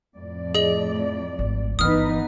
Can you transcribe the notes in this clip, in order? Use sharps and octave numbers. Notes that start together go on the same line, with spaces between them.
F2 A2 D5
G#4 D#5 F#7
G#1
G1 E3 B3 D#4 B4 D#6 F6